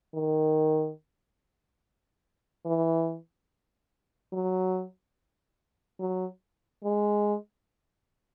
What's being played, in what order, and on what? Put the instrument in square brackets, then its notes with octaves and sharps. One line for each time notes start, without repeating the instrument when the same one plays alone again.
[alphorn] D#3
E3
F#3
F#3
G#3